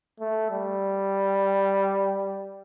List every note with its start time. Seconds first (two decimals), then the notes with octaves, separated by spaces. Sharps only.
0.20 A3
0.51 G3